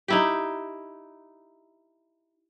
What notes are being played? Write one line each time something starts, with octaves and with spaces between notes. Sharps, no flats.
D#4 E4 G4